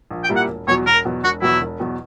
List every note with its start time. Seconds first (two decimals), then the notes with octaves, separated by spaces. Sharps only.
0.11 A#1
0.24 G5
0.29 A#2 G3 A#3 E4
0.36 F#5
0.48 E1
0.67 E2 B2 F#3 C#5
0.86 E1 A#4
1.05 E2 B2 F#3
1.24 E1 F#4
1.42 E2 B2 F#3 E4
1.61 E1
1.79 E2 B2 F#3